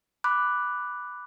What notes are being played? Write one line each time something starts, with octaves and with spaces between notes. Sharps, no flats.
B5 D6 F#6